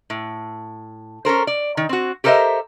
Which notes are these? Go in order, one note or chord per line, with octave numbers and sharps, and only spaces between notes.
A2
C#4 A4 A#4 C5
D5
D#3
C4 F#4
G4 A4 A#4 C5 D#5 E5